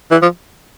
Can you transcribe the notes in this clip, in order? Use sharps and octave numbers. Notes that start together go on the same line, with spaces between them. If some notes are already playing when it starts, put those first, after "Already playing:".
E3
F3